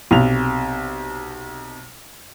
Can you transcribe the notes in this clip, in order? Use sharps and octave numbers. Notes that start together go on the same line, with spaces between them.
B1 C3 F7